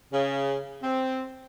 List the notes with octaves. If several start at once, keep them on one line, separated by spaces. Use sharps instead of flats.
C#3
C4